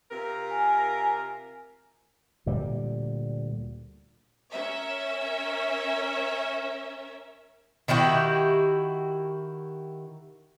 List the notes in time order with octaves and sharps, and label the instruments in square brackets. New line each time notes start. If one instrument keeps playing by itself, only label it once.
[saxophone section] C3 F4 A#4
[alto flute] G#5
[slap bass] D2 A#2 G3
[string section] C#4 A#4 E5
[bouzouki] D#3 E4 F#4 G4